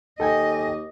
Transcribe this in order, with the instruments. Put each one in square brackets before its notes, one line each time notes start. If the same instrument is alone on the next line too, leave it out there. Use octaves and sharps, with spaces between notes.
[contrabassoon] D#2 [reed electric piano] A4 G5 G#5 [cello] D#5